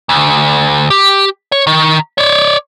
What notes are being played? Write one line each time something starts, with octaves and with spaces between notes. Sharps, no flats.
D2
G4
C#5
D#3
C#5 D5